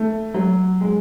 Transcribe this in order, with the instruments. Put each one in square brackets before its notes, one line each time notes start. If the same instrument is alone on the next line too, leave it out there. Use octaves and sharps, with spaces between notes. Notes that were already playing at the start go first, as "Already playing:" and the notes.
Already playing: [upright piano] A3
F#3
G#3